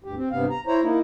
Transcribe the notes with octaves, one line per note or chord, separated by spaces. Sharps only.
D2 G2 G4
C4
G2 C3 B3 F5
A#5
E4 C5 C#5 A#5
A#3 D#4 E4